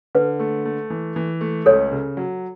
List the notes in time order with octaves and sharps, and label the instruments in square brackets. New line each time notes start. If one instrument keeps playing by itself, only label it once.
[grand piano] D3 [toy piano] B4
[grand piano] A3
A3
E3
E3
A3
[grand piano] C#2 [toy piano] A4 C#5
[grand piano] C#3
F#3